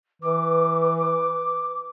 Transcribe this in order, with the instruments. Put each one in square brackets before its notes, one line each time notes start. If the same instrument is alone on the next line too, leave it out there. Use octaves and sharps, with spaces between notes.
[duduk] E3 [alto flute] B4 [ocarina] D6